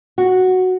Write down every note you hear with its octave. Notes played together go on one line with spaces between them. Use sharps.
F#4